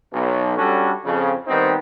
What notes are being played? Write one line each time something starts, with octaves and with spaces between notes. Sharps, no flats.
B1
G3 C#4 D4 F#4 A4
F2 C#3
D#3 G3 B3 C4 D#4 C5